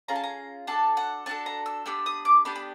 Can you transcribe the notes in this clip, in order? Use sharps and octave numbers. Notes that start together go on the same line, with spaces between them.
C#4 F4 G#4 A#5
A5
A#5
D4 F#4 A4 A5
F#5
D4 F#4 A4 A5
A#5
E6
B3 D4 G4 E6
D#6
D6
B3 D4 G4 B5
B5